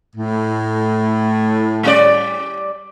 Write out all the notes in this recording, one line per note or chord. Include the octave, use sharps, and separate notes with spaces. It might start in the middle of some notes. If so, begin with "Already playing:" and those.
A2
G3 C#4 D5